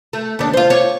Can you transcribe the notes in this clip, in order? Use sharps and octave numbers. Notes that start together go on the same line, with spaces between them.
A3
D#2 D4
F4 C5
C#5 D5